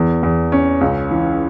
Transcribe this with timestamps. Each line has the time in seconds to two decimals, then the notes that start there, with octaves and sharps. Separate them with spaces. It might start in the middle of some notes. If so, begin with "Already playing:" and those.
Already playing: E2
0.23 E2
0.52 C#4
0.81 C#2
1.11 E3